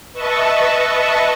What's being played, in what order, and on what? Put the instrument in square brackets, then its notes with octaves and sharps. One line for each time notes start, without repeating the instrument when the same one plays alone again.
[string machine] B4 D#5 E5 A5 C#6